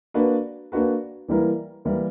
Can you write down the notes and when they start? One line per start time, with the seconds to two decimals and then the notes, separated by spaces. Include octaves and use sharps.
0.14 A#3 D4 F#4 B4
0.72 A#3 D4 F#4 B4
1.28 E3 G3 A#3 E4 A#4
1.85 E3 G3 A#3 E4 A#4